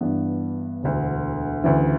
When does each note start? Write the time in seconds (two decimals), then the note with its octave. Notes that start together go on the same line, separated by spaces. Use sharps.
0.01 G2 E3 B3 D4
0.83 E1 D2 D3
1.64 D2 C#3 E3